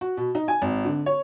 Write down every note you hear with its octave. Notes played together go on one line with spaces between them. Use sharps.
F#4
B2
D#4
G#5
G#1
D3
C#5